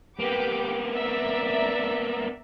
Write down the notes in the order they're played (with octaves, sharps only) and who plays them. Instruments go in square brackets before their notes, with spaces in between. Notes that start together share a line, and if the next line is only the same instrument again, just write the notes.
[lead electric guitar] A#3 B3 [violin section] G4 B4 D6
[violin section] D5 E5 A#5